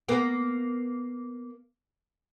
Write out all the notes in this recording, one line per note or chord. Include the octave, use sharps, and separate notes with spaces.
A#3 B3